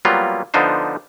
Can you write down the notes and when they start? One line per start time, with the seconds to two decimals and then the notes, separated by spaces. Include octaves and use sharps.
0.05 F#3 G3 A#3 B3 F4
0.54 D3 F3 B3 D4 D#4 C5